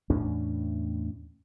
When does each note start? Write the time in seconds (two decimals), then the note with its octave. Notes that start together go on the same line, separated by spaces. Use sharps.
0.10 E2 A2 C#4 D4